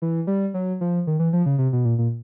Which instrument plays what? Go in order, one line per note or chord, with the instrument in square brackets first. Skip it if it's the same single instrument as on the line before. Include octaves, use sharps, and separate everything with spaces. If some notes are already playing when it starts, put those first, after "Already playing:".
[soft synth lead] E3
G3
F#3
F3
D#3
E3
F3
C#3
C3
B2
A#2
A#2